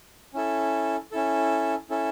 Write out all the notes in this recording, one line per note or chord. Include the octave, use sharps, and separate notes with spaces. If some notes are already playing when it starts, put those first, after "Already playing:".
C#4 E4 A4
C#4 E4 A4
C#4 E4 A4